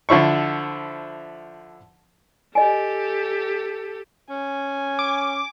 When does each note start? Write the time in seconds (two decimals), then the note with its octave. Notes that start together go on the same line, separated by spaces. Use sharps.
0.09 D3 F3 E4 C#6
2.55 G4 A4 D#5 G#5
4.30 C#4 G#5
4.99 D6